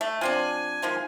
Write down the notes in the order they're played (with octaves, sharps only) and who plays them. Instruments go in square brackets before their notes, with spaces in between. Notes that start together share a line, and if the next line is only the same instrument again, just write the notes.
[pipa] A3
[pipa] F3 C4 D4 [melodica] G#5
[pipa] D#3 F3 G#3